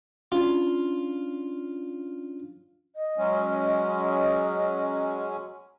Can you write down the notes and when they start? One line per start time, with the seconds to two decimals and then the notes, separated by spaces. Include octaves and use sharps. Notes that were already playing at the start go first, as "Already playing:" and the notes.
0.32 C#4 D4 F4
2.94 D#5
3.18 F#3 G#3 C#4